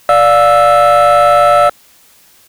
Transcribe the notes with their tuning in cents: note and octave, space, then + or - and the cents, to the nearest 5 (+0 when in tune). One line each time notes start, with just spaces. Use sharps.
D5 +0 F5 +20 E6 +0